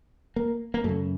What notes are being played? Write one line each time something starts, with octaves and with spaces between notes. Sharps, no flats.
A#3
A#3
F#2 C#3 A3